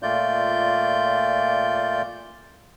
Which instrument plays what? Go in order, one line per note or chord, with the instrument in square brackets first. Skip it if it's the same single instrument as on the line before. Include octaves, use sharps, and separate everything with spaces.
[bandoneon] A#2 A3 F4 D5 G6